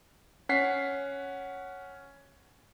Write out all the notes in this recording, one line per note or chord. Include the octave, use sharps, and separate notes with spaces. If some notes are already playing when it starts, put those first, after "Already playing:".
C#4 F#5 B6 C7